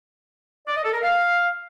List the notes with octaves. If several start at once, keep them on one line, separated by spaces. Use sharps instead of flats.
D5
D#5
A4
A#4
F5